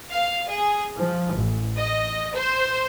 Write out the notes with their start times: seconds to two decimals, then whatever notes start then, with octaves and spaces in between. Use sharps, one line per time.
0.11 F5
0.49 G#4
0.97 F3
1.33 A1
1.76 D#5
2.33 C5